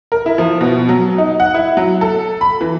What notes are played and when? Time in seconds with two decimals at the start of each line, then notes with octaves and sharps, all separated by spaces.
0.12 A#4
0.26 E4
0.38 F3
0.61 B2
0.89 F#3
1.18 D#4
1.40 F#5
1.54 E4
1.77 F#3
2.01 A4
2.41 B5
2.61 E3